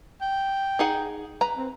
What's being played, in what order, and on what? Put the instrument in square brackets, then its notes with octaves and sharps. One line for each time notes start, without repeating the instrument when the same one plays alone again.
[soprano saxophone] G5
[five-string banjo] D#4 G#4 F#5
B4 A#5
[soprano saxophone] C4